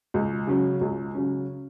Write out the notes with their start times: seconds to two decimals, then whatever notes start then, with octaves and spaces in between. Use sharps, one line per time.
0.14 C#2
0.47 C#3 F#3 C#4
0.81 C#2
1.14 C#3 F#3 C#4